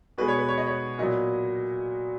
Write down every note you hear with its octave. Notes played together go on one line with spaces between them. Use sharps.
B2 G#3 B3 B4
C#5
B4
C#5
D#5
C#5
A#2 F#3 B3 D#5